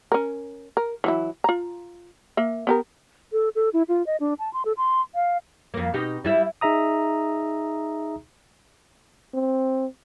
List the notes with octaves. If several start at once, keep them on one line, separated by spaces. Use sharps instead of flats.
C#4 A#4
A#4
E3 F#3 E4
F4 A#5
A#3 E5
B3 G4 A#4
A4
A4
E4
F4
D#5
D4
A5
C6
A4
C6
F5
F2 A#3
B2 D#4 G4
G3 E4 E5
D#4 G#4 E5 A#5 D#6
C4